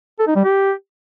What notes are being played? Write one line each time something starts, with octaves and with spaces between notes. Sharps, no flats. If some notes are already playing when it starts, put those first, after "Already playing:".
A4
D#4
G3
G4